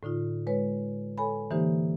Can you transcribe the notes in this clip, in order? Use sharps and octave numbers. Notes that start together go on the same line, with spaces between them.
A2 D3 D#4 F4
G#3 B4 C#5
A4 C#5 G#5 B5
D3 E3 A#3 D#4 G4 C5